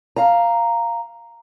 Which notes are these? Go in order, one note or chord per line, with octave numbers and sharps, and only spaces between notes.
F5 A#5